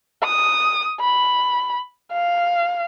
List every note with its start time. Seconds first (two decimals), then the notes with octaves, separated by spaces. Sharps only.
0.23 D#6
1.00 B5
2.12 F5